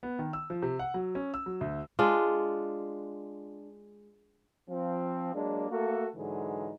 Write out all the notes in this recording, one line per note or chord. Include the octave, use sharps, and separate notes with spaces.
B3
D#3
E6
F3
C3
F#5
F#3
C#4
E6
F#3
D2
G#3 D4 F4
F3 C4
F#3 G#3 A#3 D4
A3 A#3 F#4 A4
G#2 D3 E3 F#3 G#3 D#4